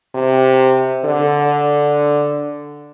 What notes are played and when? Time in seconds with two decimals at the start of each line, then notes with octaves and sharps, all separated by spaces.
0.15 C3
1.05 D3